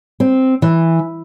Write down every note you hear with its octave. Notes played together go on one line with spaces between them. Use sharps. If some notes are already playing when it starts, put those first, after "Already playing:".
C4
E3